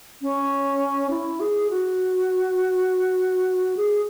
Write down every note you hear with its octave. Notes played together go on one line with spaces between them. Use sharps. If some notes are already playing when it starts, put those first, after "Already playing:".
C#4
E4
G#4
F#4
G#4